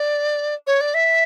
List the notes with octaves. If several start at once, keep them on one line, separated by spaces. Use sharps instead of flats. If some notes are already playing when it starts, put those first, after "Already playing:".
Already playing: D5
C#5
D5
E5